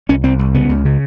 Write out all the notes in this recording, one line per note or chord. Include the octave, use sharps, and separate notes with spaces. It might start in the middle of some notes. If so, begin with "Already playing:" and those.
C2 C#4
C2 C4
C2
C#3 B3
C#2
C#3